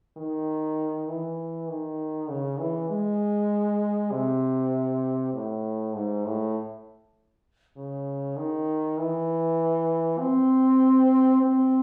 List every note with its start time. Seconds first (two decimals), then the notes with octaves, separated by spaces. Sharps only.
0.17 D#3
1.08 E3
1.69 D#3
2.29 C#3
2.60 E3
2.90 G#3
4.11 C3
5.33 A2
5.94 G#2
6.25 A2
7.77 C#3
8.37 D#3
8.98 E3
10.19 C4
11.41 C4